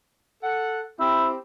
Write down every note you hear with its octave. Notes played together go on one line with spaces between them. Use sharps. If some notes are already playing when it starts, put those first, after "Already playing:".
A4 F#5
C4 E4 G4